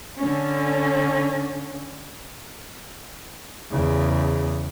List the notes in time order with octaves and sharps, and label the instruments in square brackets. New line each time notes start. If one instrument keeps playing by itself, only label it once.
[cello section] D3 C#4
[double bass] E2 C#3